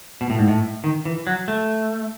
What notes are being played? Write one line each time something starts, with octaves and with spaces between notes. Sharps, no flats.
B2
A2
G#2
A2
D#3
E3
F#3
A3